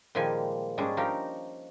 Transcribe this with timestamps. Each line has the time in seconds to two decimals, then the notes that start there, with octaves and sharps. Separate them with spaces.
0.15 A#2 D#3 F3 G3 G#3 G#5
0.78 G#2 G3 G#3 C#4 D4 G#4
0.97 F3 D#4 F4 G4 A#4 F5